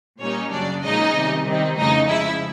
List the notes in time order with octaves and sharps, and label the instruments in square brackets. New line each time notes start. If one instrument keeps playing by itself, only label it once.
[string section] A#2 G3 A#3 C#4 D#4 C#5
F#2 C#3 F#3 D4 D5
A#2 F3 G#3 C#4 D#4 D#5
C3 D#3 G3
D#3 G3 C4 D#4
F2 C#3 E3 A3 D#4 D#5
C#3 F3 G#3 E4 E5